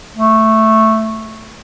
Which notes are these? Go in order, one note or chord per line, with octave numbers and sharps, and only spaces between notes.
A3